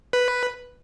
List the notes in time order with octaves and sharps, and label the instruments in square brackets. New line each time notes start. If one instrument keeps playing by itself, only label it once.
[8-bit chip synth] B4